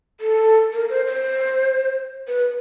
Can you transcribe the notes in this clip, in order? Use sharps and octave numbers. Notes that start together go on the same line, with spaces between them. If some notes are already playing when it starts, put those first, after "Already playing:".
A4
A#4
C5
C5
B4